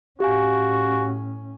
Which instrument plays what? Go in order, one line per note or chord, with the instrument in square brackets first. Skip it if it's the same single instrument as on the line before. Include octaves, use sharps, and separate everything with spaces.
[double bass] A2 C#4 [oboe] F#4 [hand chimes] G4 F5 G#5